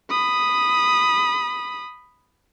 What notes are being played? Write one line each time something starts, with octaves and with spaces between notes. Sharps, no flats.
B5 D#6